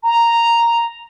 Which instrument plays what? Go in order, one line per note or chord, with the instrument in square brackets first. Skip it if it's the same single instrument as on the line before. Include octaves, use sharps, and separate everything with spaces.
[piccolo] A#5